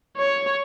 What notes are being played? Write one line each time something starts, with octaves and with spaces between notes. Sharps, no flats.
C#5